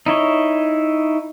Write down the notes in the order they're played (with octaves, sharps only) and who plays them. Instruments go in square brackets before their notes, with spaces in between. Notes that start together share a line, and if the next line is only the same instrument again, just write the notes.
[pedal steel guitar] D#4 E4 C#5 D#5